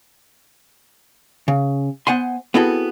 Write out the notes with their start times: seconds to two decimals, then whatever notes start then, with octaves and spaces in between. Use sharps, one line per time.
1.48 C#3
2.07 B3 C5 F#5 G#5 C6
2.54 B3 C4 E4 F#4 G#4 A4